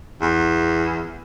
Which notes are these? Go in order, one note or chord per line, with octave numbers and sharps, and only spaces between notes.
E2